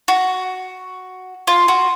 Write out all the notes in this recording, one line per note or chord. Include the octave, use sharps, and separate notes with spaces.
F#4
F4
F#4